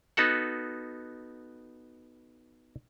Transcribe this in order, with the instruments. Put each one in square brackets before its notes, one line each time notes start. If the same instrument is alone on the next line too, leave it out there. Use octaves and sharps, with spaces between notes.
[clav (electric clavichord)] B3 D#4 F#4 A4 F#5